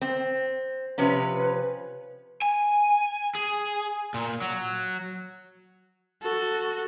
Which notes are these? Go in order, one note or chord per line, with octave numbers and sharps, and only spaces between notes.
C4
C3 F3 C#4 B4
G#5
G#4
A#2
F#3
F#4 A4